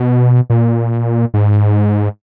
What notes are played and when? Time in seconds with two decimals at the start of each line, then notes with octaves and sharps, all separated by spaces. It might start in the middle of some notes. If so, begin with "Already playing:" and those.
Already playing: B2
0.50 A#2
1.34 G#2